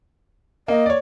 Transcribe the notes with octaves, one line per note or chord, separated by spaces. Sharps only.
A#3 D#5
C#5 D5